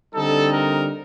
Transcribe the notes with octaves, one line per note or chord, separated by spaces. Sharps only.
D3 G3 C4 D#4 A4
A#4